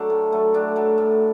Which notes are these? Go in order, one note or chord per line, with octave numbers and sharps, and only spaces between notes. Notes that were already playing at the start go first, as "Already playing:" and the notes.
Already playing: F#3 A3 D4
A2
F#3 A3
A2 D4
F#3 A3
A2